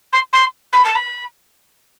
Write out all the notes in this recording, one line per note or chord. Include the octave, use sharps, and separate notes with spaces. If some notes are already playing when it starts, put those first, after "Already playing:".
C6
C6
B5
A5
B5